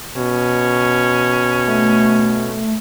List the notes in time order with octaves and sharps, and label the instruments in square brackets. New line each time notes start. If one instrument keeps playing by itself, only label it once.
[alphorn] B2 [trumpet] C#4
[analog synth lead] A3